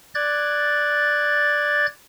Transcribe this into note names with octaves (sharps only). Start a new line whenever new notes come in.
D5 F#6 G#6 A6